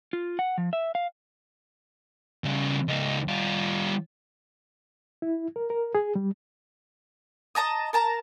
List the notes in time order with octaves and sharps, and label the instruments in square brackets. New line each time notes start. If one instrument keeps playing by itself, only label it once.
[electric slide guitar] F4
F#5
F3
E5
F5
[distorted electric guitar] C#3 G3
C#2 D#4
G3 F4
[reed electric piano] E4
A#4
A#4
G#4
G3
[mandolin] D#5 A5 A#5 D#6
A#4 A5 A#5